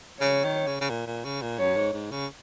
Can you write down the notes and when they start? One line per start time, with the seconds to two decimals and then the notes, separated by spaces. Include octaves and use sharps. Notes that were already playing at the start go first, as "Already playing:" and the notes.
0.20 C#3 C#5
0.44 D#3
0.66 C#3
0.81 C#3
0.90 A#2
1.07 A#2
1.24 C#3
1.42 A#2
1.58 F#2 C#5
1.76 G#2
1.93 G#2
2.11 C#3